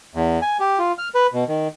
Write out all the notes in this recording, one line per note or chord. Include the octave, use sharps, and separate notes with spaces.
E2
G#5
G4
F4
F6
B4
B2
D#3